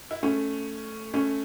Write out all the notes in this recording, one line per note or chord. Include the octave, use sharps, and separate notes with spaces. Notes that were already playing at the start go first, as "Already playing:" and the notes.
E4
A3 C#4
A3 C#4